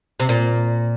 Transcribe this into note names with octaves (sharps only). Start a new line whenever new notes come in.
C3
A#2